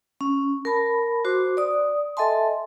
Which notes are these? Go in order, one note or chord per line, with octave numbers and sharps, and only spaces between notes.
C#4
A#4 A5 B5
F#4 C5 C6 D6
D5 D#6
A4 D#5 E5 G#5 A5 C6